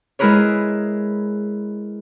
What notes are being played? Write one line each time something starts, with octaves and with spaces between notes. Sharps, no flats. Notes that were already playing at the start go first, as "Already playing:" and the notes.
G#3 E4 G#4 A#4 B4 C#5